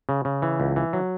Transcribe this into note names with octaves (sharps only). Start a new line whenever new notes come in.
C#3
C#3
E3
C#2
E3
F#3